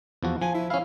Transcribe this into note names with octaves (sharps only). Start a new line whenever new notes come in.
E2 F3 F#4
F3 G#5
E4
C#4 E4 F5